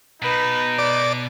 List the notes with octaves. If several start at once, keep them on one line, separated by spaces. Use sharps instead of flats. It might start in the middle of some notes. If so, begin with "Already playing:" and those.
B2 D#4 B4
D5